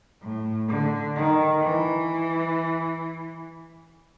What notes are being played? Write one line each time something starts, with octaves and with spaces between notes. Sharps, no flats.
A2
D3
D#3
E3